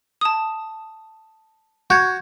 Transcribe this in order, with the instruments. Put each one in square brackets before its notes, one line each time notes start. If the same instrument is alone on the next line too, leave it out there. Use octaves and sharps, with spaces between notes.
[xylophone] A5 D#6
[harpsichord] F#4 [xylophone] G6 G#6